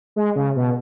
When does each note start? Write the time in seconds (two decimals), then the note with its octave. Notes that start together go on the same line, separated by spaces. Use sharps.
0.16 G#3
0.36 C#3
0.56 B2